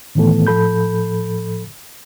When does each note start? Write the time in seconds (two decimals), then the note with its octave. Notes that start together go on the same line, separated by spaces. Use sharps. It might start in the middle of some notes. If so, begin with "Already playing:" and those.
0.15 A2 D#3 E3 A3 B3 A4
0.47 A2 F3 A4 B5 G6